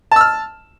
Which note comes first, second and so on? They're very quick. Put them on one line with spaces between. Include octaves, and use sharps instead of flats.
A5 E6 F6